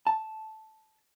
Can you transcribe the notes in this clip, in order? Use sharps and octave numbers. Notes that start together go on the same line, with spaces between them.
A5